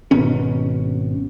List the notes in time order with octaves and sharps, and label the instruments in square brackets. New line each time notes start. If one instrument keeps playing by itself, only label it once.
[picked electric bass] G#1 B2 C#4